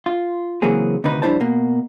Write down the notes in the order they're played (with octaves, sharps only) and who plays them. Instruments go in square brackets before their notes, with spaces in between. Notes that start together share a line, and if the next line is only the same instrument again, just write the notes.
[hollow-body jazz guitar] F4
C#3 E3 F#3 A#3 C4 G#4
D2 C3 D#3 D#4 B4
F2 G3 D4 E4 C5 A5
B2 A#3